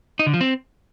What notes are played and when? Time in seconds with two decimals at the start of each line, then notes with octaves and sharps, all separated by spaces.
0.19 D#4
0.27 D3
0.34 F3
0.41 C4